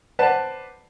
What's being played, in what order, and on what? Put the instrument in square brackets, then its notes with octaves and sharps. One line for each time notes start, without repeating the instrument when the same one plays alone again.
[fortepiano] B4 C5 D5 F#5 A5